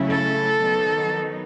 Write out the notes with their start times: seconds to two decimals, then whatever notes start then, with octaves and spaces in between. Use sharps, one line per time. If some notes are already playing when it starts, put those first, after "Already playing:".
Already playing: C#3 F#3 A3 C#4 E4
0.10 A4
0.58 D#3 F#3 B3 D#4